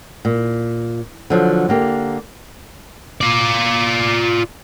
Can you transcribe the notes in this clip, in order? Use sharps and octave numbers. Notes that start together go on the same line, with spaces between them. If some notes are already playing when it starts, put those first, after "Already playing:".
A#2
D3 F3 F#3
D3 A#3 G4
F4 D5